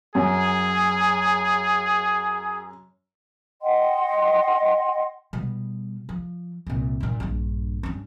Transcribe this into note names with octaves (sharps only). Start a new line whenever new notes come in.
F#2 G#4
D#5 F#5 G5 C6
B2 G3
F3
C2 A#2
G2 A#2
A#1 G2
G2 C#4